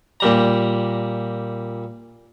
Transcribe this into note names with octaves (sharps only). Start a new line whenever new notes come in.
A#2 G3 A#5